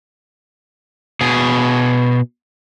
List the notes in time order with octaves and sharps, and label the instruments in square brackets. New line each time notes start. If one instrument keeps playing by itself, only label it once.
[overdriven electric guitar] B2 G#4